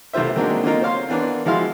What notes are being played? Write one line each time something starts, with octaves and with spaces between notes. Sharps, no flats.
B1 C3 A3 F4 C5 E5
D#3 F#3 G#3 A#3 C4 D4
D3 A#3 C4 D#4 F4 A#4
C5 C#5 F5 C6
E3 B3 D4 A#4
F3 G#3 E4 F#4 F5 C6